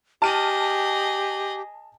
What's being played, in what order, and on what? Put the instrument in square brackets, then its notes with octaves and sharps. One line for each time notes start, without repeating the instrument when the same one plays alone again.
[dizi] G4 [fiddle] G#4 D#5 [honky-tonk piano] A5 F6 D#7